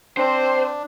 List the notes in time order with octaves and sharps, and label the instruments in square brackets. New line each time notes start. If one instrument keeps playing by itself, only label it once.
[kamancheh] C4 [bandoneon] D4 [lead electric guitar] C5